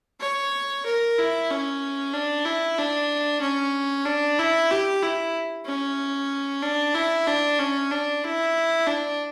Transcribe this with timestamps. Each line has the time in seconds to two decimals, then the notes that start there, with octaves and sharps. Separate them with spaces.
0.21 C#5
0.86 A#4
1.18 E4
1.50 C#4
2.14 D4
2.45 E4
2.78 D4
3.41 C#4
4.06 D4
4.39 E4
4.71 G4
5.02 E4
5.66 C#4
6.62 D4
6.95 E4
7.27 D4
7.59 C#4
7.91 D4
8.24 E4
8.87 D4